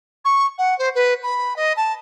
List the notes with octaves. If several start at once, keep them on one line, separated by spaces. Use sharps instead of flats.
C#6
F#5
C5
B4
B5
D#5
A5